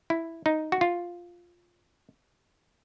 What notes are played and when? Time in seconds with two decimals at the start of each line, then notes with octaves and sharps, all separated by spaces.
0.10 E4
0.46 D#4
0.72 F#4
0.81 F4